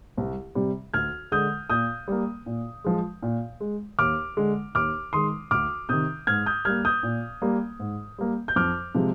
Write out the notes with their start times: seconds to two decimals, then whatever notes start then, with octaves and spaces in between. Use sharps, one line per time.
0.17 C2
0.55 C3 G3
0.94 D2 F6 G#6
1.32 D3 G#3 D#6 G6
1.70 A#2 D#6 G6
2.08 G3 A#3
2.46 A#2
2.84 F3 G#3
3.23 A#2
3.60 G#3
3.99 D#2 D6 F6
4.37 D3 G#3
4.75 D#2 D6 F6
5.13 D#3 G#3 C6 D#6
5.51 D2 D6 F6
5.89 C3 D#3 D#6 G6
6.27 G#2 F6 G#6
6.46 D#6 G6
6.65 G3 A#3 F6 G#6
6.85 D#6 G6
7.03 A#2
7.42 G3 A#3
7.80 G#2
8.18 G3 A#3
8.48 G6
8.56 F2 D6 F6
8.95 C3 F3 G#3